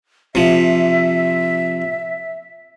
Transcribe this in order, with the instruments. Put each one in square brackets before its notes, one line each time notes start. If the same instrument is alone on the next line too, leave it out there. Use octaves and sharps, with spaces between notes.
[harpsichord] C3 F3 [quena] E5